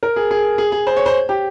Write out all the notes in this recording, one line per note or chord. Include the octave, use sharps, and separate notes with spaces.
A#4
G#4
G#4
G#4
G#4
C5
C#5
C5
G4